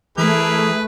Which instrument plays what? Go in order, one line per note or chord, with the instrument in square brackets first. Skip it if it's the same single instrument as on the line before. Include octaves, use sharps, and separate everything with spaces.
[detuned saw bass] E3 [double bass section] A3 [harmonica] E4 G#4 A#4 [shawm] B4